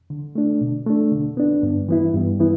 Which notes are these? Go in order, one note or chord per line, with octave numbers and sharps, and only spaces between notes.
D3
A3 D4
B2
A3 D4
D3
B3 D4
G2
E3 B3 E4
G2
E3 B3 E4